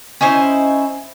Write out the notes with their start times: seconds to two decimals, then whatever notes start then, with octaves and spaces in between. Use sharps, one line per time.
0.21 C#4 D#4 E4 C5